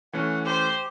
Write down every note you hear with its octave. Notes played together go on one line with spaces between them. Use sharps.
E3 A3 C#4 F#5
G4 C5